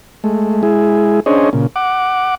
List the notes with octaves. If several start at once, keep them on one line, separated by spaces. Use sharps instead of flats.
G#3 A3
G#3 E4 G#4
C#4 D4 G#4 C5 C#5 D#5
A#2 C#3
F#5 D6